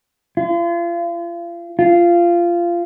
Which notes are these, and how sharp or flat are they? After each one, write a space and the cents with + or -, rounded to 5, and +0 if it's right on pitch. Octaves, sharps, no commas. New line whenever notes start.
F4 -35
F4 -15